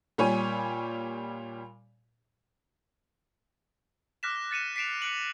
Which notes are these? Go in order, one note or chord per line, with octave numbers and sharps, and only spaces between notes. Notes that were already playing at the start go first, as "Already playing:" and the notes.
A#2 G3 C#5 G#5
D6 F6 F#6 A#6 B6 E7
A6 C#7 D#7 E7
B6 C7 D7 E7 F7
F#6 C#7 D7 F#7